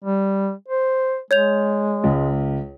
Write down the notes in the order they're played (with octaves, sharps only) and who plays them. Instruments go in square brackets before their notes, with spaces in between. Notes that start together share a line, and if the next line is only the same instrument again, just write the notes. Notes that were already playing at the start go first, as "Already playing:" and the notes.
[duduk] G3
C5
[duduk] G#3 [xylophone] C#5 G6 F7
[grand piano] C#2